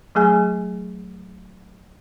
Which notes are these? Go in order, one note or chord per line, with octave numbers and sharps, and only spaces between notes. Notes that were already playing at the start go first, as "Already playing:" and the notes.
F#3 A3 G#4 G#5